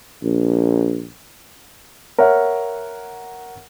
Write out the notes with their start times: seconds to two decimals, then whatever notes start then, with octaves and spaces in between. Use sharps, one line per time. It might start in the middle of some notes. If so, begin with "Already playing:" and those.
0.23 A#1
2.18 A#4 C#5 E5 F#5